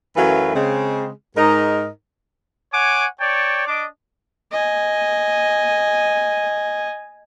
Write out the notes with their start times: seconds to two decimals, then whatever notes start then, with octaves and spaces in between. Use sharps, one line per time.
0.16 F#2 E3 F#3 A3 B4 F5
0.55 C#3 G#3 C4
1.37 G#2 D#4 A#4
2.73 C#5 F#5 G#5 D6
3.20 C#5 D5 G5 A5
3.67 D4 D#5 D6
4.52 D#5 G#5